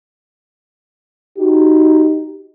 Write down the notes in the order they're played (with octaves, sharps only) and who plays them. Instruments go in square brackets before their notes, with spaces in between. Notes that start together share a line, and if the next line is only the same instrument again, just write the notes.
[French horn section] D#4 F#4 G4